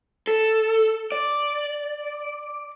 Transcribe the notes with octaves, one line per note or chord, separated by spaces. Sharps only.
A4
D5